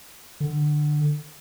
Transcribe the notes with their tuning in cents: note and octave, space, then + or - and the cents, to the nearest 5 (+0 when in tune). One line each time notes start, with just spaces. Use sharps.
D3 +20